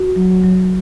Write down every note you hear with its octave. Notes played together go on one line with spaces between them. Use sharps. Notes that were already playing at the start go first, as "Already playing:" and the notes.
Already playing: F#4
F#3
F#3